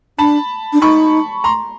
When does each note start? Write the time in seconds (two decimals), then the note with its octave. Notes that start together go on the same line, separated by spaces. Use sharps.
0.18 D4 A5 B5
0.73 D4
0.81 D#4 B5 C#6
1.44 A#5 C6